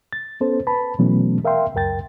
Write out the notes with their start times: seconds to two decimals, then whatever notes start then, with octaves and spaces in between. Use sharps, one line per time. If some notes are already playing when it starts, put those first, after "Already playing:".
0.13 A6
0.41 B3 C#4 A4 C5
0.67 B4 A5 B5
0.99 B2 E3 F#3 A3 B3 C#4
1.45 A#4 E5 F5 G5 C6
1.74 C#2 F#2 A#4 G5 A6